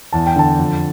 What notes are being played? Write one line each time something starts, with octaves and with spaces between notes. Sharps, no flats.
E2 A5
G5
D3 A5
F2